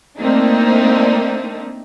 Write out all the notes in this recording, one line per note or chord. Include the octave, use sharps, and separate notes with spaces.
A3 A#3 C4 D4 D#4